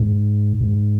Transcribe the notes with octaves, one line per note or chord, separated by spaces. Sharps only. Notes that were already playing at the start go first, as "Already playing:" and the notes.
Already playing: G#2
G#2